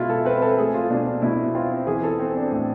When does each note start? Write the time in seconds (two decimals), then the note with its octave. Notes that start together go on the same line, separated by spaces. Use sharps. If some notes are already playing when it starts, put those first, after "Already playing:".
Already playing: B2 G#3 E4 F4
0.10 A4
0.25 C4 B4
0.42 A4
0.58 A3 G#4
0.74 F4
0.90 B2 D4
1.06 D4
1.22 B2 E4
1.55 C4 F4
1.87 E3 G#4
2.03 A4
2.20 C4
2.36 D4
2.52 A2